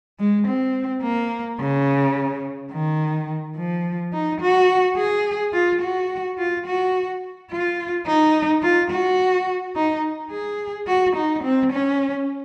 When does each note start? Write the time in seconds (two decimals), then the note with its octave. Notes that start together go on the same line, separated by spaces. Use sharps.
0.19 G#3
0.48 C4
1.03 A#3
1.59 C#3
2.72 D#3
3.57 F3
4.13 D#4
4.41 F#4
4.97 G#4
5.53 F4
5.81 F#4
6.38 F4
6.66 F#4
7.51 F4
8.07 D#4
8.63 F4
8.91 F#4
9.76 D#4
10.31 G#4
10.87 F#4
11.17 D#4
11.44 C4
11.72 C#4